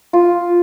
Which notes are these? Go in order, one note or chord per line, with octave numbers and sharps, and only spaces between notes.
F4